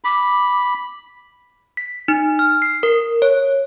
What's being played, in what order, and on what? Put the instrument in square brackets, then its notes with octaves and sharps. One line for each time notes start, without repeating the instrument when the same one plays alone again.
[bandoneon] B5 [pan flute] D6
[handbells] B6
D#4
F6
C7
A#4
C#5